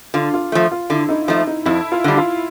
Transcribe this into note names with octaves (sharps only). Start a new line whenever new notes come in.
D3 F4
F4
F3 A3
F4
D3 E4
D#4
F3 A3 D#4
D#4
F2 E4
F4
D3 G3
F4